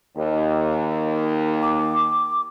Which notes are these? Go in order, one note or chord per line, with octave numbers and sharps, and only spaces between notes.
D#2
D6